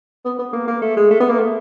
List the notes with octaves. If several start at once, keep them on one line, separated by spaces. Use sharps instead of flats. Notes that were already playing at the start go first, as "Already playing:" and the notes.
B3
B3
A#3
A#3
A3
G#3
A3
B3
A#3
A3